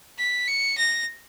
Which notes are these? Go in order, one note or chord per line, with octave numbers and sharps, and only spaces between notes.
B6
C#7
A#6